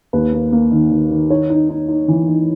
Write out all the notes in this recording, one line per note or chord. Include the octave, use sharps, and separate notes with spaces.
D#2 B4
A#3
A#3
D#3
D#3
D#3
D#4 C#5
D#4
D#4
D#4
E3
D#4